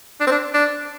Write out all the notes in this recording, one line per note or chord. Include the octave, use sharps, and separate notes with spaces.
D4
C4
D4
D4